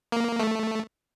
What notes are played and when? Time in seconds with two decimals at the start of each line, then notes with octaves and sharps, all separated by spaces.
0.12 A#3
0.39 A3